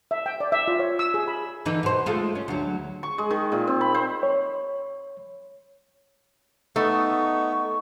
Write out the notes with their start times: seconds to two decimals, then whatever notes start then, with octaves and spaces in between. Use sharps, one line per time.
0.11 E5
0.26 G5
0.40 D5
0.52 E5
0.68 F4
0.79 C#5
0.99 E6
1.14 G#4
1.28 B5
1.65 D3 E3 D#4
1.83 B2 C5
2.06 G#3 A3 F4
2.35 C#4
2.48 D2 F#3
3.03 C#6
3.18 G#3
3.31 D#3
3.52 A#2
3.67 C4
3.81 B5
3.94 C5
4.23 C#5
6.76 A3 B3 D#4 C#6